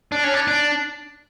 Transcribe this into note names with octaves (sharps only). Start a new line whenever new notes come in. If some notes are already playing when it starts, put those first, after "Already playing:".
D4
C#4
D4
D4